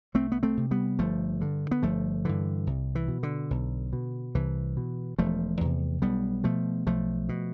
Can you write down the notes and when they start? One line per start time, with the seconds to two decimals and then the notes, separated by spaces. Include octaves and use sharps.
0.14 C2 A3 C4
0.32 B3
0.43 A3 C4
0.57 C3
0.71 G3 B3
0.99 G1 F3 A3
1.41 G2 D3
1.71 B3
1.83 G1 F3 A3
2.25 G2 D3 E3
2.67 C2
2.95 E3
3.08 B2
3.23 D3
3.50 B1
3.93 B2
4.35 C2 E3
4.77 B2
5.18 E1 F3 A3
5.61 E2 C3
6.02 B1 G3 B3
6.44 B2 F3 A3
6.87 B1 F3 A3
7.29 B2